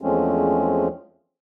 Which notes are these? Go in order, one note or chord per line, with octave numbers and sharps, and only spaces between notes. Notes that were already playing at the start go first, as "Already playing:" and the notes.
E2 F3 G#3 A3 C4 C#4